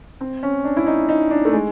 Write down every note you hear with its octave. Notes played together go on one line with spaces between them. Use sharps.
C4
C#4
D4
E4
D#4
D#4
D4
A3
G#3